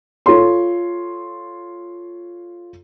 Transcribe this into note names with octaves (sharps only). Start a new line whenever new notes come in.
F4 A4 C#5 C6